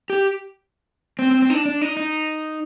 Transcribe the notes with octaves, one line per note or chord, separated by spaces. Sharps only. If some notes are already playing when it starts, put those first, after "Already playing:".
G4
C4
C4
C4
D#4
D4
D4
D#4
D#4